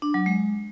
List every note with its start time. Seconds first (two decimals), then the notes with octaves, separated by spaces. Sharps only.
0.02 D4
0.14 F#3
0.26 G#3